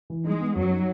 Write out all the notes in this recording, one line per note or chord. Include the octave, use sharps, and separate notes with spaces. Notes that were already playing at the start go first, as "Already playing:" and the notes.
E3
G#3 D#4
B3
F#2 F#3
D#4